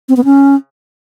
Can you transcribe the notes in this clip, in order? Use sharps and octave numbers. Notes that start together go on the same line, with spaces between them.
C4
B3
C#4